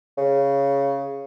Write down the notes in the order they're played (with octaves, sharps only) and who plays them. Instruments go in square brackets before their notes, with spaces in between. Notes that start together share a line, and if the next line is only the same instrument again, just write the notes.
[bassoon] C#3